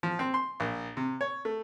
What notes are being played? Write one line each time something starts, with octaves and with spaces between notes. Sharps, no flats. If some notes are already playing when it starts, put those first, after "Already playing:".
F3
C4
C6
A#1
C3
C#5
A3